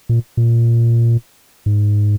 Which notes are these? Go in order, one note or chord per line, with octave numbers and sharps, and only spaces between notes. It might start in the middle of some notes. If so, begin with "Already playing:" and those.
A#2
A#2
G#2